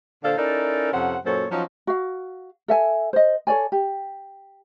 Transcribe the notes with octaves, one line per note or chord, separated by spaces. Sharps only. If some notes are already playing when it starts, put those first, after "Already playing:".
A#2 D3 D4 A4 C5 F5
C#4 D#4 E4 A4 A#4 D5
F2 C3 C#4 C5 F#5
F#2 A#2 F#3 A4 C5 C#5
F3 F#3 C#4 D#4 F4
F#4 F5
A4 E5 G#5
C5 D#5
A4 C#5 D5 G#5
G4